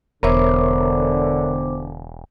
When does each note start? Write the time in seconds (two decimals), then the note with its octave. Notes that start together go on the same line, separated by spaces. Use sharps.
0.23 E1 D3 B3 A#4 C5 C#5 E5 D6